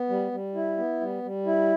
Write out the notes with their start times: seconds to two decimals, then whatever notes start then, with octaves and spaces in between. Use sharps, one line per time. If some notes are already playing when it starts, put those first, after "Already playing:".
Already playing: B3
0.09 G3
0.32 G3
0.55 E4
0.78 B3
1.01 G3
1.23 G3
1.46 E4